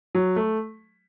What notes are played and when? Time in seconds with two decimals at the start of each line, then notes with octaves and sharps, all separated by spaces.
0.15 F#3
0.36 A3